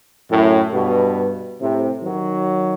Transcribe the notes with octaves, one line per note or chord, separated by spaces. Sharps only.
F#2 A2
G2 B2
A2 C3
D#3 F#3